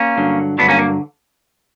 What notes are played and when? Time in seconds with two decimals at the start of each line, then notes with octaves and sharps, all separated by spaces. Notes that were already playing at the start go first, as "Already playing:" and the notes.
Already playing: A#3 C#4
0.17 G2 D3 F#3
0.58 G2 D3 F#3 B3 D4
0.68 A#3 C#4
0.79 A#3